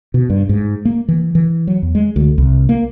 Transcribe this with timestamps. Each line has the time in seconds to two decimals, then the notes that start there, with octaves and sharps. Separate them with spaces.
0.14 B2
0.30 G2
0.49 G#2
0.85 A#3
1.08 E3
1.35 E3
1.67 F#3
1.82 E2
1.95 G#3
2.16 D2
2.38 C2
2.69 A#3